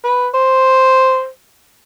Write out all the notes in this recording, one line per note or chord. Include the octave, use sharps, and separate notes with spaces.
B4
C5